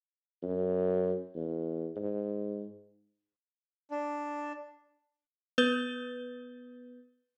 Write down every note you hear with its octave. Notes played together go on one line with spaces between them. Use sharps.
F#2
E2
G#2
D4
B3 B4 G6 G7